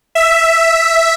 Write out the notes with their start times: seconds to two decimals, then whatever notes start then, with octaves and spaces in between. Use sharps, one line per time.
0.15 E5